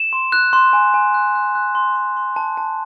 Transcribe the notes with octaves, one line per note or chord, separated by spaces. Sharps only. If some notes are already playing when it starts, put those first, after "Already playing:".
Already playing: E7
C6
F#6
C6
G#5
G#5
F#6
F#6
F#6
C6
C6
C6
A5
A5